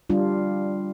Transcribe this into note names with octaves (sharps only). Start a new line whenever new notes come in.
G3 D4 F4